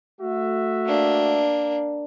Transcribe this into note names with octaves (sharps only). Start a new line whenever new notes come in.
A3 F#4 E5
A#3 D4